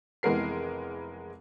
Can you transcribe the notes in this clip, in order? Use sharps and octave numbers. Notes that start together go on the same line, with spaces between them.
F1 E3 G#3 B3 A#4 C7